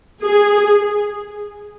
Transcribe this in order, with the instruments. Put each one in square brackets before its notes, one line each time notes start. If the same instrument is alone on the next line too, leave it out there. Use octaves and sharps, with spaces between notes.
[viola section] G#4